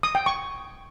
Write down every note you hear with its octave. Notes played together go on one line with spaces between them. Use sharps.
D#6
G5
C#6